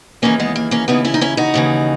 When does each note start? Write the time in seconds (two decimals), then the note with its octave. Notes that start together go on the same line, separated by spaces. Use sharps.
0.22 D#2 C#3 E3 A#3 C#4
0.40 G#3 B3
0.56 A#3
0.71 A#3 C#4
0.88 D#2 C#3 E3 B3 D#4
1.05 C#4 E4
1.14 D#4
1.21 C#4 E4
1.37 D#4 F#4
1.54 D#2 C#3 E3